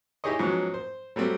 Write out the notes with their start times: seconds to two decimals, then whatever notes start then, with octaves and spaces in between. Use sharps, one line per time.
0.24 D#4 E4 G4 G#4 C#5 D#5
0.39 G#2 F3 F#3 B3 C#4
0.74 C5
1.16 F#3 G3 A3 C4